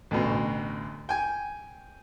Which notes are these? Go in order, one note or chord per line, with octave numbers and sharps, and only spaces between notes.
A1 D2 B2
G5 G#5